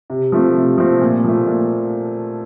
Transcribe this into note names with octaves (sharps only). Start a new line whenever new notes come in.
C3
F3 A3 C4
C3
F3 A3 C4
A#2
F3 A3
A#2